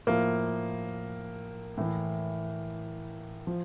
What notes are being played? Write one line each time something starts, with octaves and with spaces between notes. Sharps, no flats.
A2 F3 A#3
A2 E3
F3